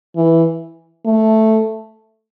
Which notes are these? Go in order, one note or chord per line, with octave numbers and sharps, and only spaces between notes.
E3
A3